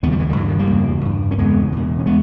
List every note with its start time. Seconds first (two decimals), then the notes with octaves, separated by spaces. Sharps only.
0.03 D#2 G#3 B3
0.08 C#3 G3 A#3
0.19 E3 G#3
0.29 D#3 G3
0.36 G2 E3
0.48 D#3
0.59 G3 A#3
0.71 E2 C#3
1.05 G2
1.31 C#4
1.38 E2 C#3 G#3 B3
1.72 E2 B2
1.99 C#4
2.06 G#3 B3